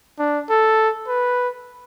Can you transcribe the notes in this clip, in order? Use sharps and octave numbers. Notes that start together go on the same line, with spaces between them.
D4
A4
B4